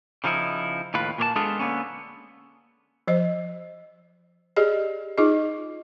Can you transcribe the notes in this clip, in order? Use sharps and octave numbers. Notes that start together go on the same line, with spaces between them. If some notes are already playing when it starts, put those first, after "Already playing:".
C#3 F3 D#4 E4
D#2 A2 F4 B4
A#2 A#3 C#5 A5
G#3 B3 D4 F4 G#4 A4
D3 A#3 B3 C#4
F3 C5 D#5
G4 G#4 D5 D#5
D#4 F4 G#4 D#5